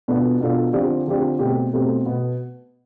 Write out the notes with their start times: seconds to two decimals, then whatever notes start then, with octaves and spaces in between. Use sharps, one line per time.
0.08 B2 B3 D4 F4 A4
0.40 B2 B3 D4 F4 A4
0.73 D3 F3 C4 G4 D5
1.07 D3 F3 C4 G4 D5
1.39 B2 A3 C4 G4
1.73 B2 A3 C4 G4
2.06 B2 B3